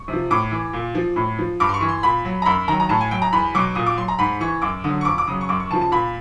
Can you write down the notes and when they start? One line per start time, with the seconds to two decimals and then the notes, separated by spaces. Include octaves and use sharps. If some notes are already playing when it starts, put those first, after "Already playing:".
Already playing: C#6
0.08 C3 F3
0.30 A2 D6
0.51 E3
0.73 A#2
0.95 F3
1.16 A2
1.38 F3
1.60 G2 D6
1.69 C6
1.74 C#6
1.81 E3
1.89 C6
2.03 A#2 B5
2.25 F#3
2.42 A#5
2.46 F#2 B5
2.68 D#3 A#5
2.72 F#3
2.80 A#5
2.89 A2 A5
3.01 G#5
3.11 F#3 G5
3.22 A#5
3.32 E2 B5
3.54 B2 F#3 D6
3.75 A#2 D#6
3.86 D6
3.97 F#3 C6
4.08 A#5
4.19 G#2 B5
4.40 E3 C#6
4.62 F#2 D6
4.84 D3 F#3 D#6
5.01 C#6
5.05 F2 D6
5.18 D6
5.27 C#3 F#3 D#6
5.41 C#6
5.49 F#2 D6
5.60 C#6
5.70 C#3 F3 A5
5.81 A5
5.92 A#2 B5